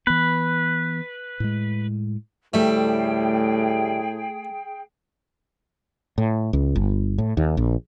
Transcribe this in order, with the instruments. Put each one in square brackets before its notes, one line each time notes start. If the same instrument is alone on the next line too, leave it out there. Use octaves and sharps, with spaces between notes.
[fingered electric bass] E3 B3 [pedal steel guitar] B4
[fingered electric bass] A2 G#3
[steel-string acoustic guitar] D2 G3 E5 [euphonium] A2 [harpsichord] A3 [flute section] G#4 G5
[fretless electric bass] A2
C#2
G1
A2
D#2
A#1